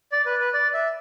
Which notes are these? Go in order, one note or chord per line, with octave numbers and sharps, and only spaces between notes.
D5
B4
B4
D5
E5